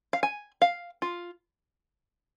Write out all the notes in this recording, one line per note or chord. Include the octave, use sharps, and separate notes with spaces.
F5
G#5
F5
F4